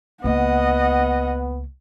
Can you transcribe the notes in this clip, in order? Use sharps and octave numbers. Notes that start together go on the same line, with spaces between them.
C#2 A#3 B3 D#5 F#5